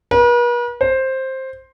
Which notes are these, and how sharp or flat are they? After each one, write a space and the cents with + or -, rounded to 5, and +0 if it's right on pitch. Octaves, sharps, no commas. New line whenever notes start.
B4 -45
C5 +10